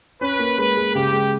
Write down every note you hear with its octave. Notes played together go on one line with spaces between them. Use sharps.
C#4 B4
A#3
G#3 B4
G#3
C#3 G4
G#3